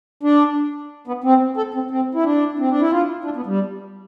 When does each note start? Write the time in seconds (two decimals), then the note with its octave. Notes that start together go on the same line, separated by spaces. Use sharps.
0.23 D4
1.07 B3
1.24 C4
1.57 A4
1.74 C4
1.91 C4
2.15 E4
2.24 D4
2.59 C4
2.70 D4
2.81 E4
2.91 F4
3.25 D4
3.36 B3
3.46 G3